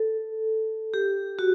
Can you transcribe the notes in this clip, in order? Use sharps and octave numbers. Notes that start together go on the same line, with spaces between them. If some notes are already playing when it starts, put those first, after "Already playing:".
Already playing: A4
G4
F#4